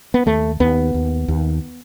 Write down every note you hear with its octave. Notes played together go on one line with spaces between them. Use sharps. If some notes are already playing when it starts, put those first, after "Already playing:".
B3
D#2 A3
D#2 B3
D#2
D#2